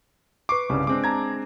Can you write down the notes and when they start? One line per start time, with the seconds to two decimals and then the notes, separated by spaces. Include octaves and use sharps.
0.49 B4 C#6 D6 C7
0.69 C2 G2 C#3 G3
0.87 G#3 C4 D4 D6
1.04 A5 A#5 G#6